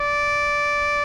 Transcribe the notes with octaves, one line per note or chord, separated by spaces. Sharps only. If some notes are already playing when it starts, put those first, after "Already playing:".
Already playing: D5